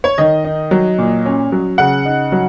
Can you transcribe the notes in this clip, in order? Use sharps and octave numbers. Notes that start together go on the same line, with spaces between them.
C#5
D#3 D#5
D#4
F#3
A#2
C#4
F#3
C#3 F#5
D#4
F#3